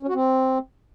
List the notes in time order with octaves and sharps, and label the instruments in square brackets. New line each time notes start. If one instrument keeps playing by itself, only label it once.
[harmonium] C#4
F#4
C4